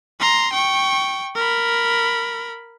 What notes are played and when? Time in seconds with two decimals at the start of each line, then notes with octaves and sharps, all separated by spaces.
0.20 A#5 C6
0.53 G5 C#6
1.35 A#4 B5